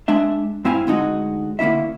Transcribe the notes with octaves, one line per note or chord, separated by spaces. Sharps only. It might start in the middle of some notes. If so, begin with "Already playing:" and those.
G#3 D4 E5
G2 C4 E4 F5 G#5
D2 G#3 D#4 F#4
D3 A#3 C#4 E4 E5